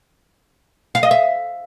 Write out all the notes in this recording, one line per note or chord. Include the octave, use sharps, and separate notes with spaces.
F5
D#5
E5